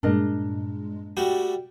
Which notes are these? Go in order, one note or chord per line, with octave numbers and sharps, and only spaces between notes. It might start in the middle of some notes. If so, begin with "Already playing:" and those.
G2 A#2 G#3 D4 A#4 D#5
G3 A3 F#4 G5